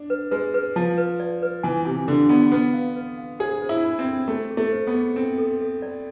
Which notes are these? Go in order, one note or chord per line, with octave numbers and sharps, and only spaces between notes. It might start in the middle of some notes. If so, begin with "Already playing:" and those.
Already playing: D4
B4
G#3 B4
B4
F3 A5
B4
D5
B4
E3 G#5
C3 G#5
D3 A4
B3 D5
B3 B4
F5
B4
F5
G#4 C5
C5
E4
B5
C4
A4
A3 G#4
G#4
A3
C5
B3
G#4
C4 A4
A4
A4
D5